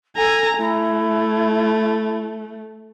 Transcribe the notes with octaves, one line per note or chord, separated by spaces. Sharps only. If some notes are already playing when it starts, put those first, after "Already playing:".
A4 G#5 A#5
A3 E4